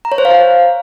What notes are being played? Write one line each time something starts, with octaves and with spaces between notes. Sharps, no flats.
A#5
C#5
C5
F5